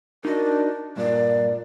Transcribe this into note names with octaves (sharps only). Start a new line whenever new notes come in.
D4 D#4 F#4 A#4 D#5
G2 A#2 D5